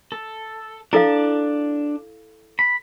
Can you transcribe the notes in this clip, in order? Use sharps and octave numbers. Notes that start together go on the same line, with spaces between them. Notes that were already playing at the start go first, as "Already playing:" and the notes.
A4
D4 E4 A4 F5 A5
B5